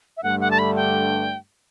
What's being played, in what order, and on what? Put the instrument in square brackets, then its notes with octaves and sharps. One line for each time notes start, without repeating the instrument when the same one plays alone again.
[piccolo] E5
[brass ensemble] G2 D3 A3 [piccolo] F#5
[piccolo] F#5
A5
B5
G5